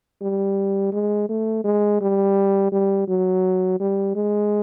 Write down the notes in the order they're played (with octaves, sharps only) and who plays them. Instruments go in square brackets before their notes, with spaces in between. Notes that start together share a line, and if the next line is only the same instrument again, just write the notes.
[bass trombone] G3
G#3
A3
G#3
G3
G3
F#3
G3
G#3